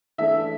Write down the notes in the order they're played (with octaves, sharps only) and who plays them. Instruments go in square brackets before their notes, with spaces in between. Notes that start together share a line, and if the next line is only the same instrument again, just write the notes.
[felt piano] E3 A3 D4 A4 [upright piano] E5